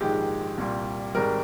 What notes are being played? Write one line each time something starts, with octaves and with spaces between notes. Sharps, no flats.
A#1 G#2 D#3 G#3 G4
C2 A#2 G3
G#1 G#2 G3 A#4